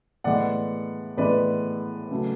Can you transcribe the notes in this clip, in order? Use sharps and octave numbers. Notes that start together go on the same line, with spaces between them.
A2 E3 G#3 B3 D5 F#5
A2 E3 G#3 B3 B4 D5
C#3 F#3 A3